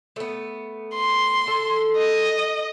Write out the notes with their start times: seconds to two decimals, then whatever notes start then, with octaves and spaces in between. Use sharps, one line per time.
0.16 A3 B3
0.95 C6
1.47 A4
1.97 D#5